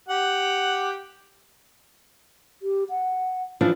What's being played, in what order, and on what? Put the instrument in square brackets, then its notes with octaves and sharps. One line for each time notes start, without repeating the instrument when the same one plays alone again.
[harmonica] G4 F#5
[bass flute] G4
F#5
[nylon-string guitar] E3 F3 D4 [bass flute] F4